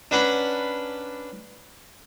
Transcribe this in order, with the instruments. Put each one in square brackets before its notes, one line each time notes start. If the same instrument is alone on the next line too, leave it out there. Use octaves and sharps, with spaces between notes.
[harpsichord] C#4 D4 B4 F#5 A#5 B5